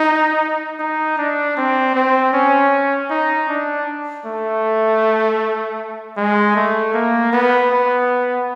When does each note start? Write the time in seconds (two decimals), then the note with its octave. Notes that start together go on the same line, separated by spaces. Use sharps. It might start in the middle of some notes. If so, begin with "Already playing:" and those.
Already playing: D#4
0.79 D#4
1.18 D4
1.57 C4
1.94 C4
2.33 C#4
3.10 D#4
3.49 D4
4.26 A3
6.17 G#3
6.56 A3
6.94 A#3
7.33 B3
7.71 B3